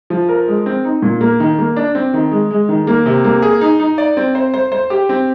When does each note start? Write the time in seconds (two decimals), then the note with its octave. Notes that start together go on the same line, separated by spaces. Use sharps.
0.10 F3
0.29 A#4
0.47 G#3
0.66 C4
0.85 D#4
1.02 A#2
1.21 A#3
1.40 D#3
1.59 A#3
1.76 D4
1.95 C4
2.14 D#3
2.31 G#3
2.51 G#3
2.69 D#3
2.87 A#3
3.06 C3
3.24 A#3
3.42 G#4
3.61 D#4
3.80 D#4
3.98 D5
4.17 C4
4.35 C5
4.54 C5
4.72 C5
4.90 G4
5.09 C4